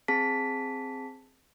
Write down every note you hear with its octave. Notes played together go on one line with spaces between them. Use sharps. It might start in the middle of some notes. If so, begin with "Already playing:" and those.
C4 G#4 A5 B6